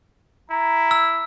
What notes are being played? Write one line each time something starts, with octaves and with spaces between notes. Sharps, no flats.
E4 A#5
E6